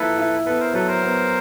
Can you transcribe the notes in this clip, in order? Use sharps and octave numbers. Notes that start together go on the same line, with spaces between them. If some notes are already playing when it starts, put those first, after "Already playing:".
Already playing: F3 A#3 E4 A4 B4
E4
B3 A4 B4
A#4 C5
F#3 A4 B4
A#4 C5
B3